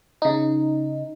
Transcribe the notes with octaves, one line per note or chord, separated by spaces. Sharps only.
C#3 D#4